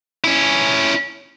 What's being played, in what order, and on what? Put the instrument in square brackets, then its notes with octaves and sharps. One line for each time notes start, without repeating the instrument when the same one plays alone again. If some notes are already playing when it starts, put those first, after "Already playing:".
[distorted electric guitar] C#4 E4